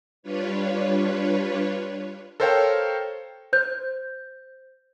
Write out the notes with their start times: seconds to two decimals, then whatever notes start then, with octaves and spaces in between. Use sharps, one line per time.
0.23 G3 D4 F4 B4 C#5
2.40 A4 A#4 C5 C#5 F5 G5
3.53 C5 G6